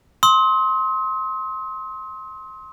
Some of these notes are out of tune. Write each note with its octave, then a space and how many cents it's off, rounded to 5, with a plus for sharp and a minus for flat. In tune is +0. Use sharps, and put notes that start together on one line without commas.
C6 +15 D#6 +45